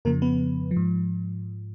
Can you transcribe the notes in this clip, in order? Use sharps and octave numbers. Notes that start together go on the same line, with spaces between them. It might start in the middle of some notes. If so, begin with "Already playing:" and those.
F2 C#3 F3 A#3 A#4
B3 B4
F3
G#2